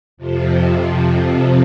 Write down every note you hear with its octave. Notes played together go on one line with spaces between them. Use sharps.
F2 C3 F3